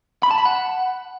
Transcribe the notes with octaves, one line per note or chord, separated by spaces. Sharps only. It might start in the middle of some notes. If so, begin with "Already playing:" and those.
B5
A5
B5
F#5